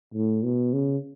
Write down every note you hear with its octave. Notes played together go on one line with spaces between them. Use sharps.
A2
B2
C#3